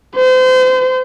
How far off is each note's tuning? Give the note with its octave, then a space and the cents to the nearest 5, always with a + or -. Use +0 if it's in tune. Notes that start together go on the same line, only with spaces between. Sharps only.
C5 -35